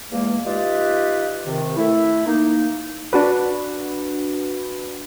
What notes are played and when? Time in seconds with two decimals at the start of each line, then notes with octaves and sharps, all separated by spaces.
0.11 E2 G#3 A#3
0.45 D#4 F4 G4 B4 D5 D#5
1.45 C3 D#3
1.76 A3 E4
2.26 A#3 D#4
3.13 D4 F#4 B4